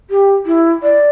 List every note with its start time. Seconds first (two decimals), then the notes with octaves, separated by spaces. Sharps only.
0.10 G4
0.46 E4
0.83 D5